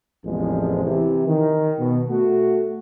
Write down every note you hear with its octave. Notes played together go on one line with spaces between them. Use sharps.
A1 E2 C3 F3 G#3
C3 E3
D#3
B2
A3 F#4